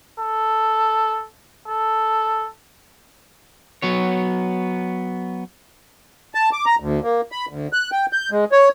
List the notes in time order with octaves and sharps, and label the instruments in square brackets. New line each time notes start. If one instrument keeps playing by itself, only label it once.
[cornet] A4
A4
[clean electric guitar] F#3 B3 C#5
[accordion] A5
D6
A#5
D2
A#3
B5
D2
F#6
G5
G6
G#3
C#5